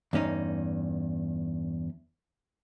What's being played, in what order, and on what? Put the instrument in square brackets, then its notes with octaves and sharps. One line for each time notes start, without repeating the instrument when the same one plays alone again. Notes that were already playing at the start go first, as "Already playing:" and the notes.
[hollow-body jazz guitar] E2 G2 C#4 D#4